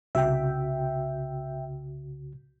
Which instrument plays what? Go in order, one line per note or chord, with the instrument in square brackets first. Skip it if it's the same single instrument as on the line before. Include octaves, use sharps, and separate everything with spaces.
[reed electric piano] C2 C#3 F#4 [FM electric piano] E5 G5